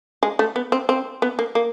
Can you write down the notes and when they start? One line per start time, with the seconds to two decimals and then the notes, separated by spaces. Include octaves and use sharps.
0.23 G#3
0.39 A3
0.56 B3
0.72 C4
0.89 C4
1.22 B3
1.39 A#3
1.55 A#3